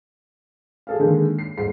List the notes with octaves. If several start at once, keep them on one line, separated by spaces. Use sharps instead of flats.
G#4 A4 F5
D3 D#3 G#3 A#3
C7
D#1 G#2 C7